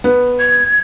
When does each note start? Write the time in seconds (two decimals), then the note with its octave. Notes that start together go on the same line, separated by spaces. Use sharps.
0.04 B3
0.39 G#6